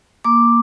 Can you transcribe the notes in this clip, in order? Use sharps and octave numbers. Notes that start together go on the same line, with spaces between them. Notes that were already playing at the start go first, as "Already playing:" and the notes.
A#3 D6